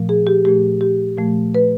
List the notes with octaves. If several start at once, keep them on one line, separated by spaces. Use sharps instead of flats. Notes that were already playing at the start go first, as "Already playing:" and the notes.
Already playing: A#2 F3 A3
G#4
G4
A#2 F3 A3 G4
G4
A#2 F3 A3
B4